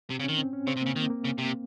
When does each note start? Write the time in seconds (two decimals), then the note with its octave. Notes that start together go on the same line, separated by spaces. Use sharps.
0.10 C3 C4
0.20 C#3
0.24 D#3 C#4
0.38 C4
0.53 C#4
0.67 C#3 C4
0.77 C3
0.82 C#3 A#3
0.96 D#3 A#3
1.10 A#3
1.25 C#3
1.38 C3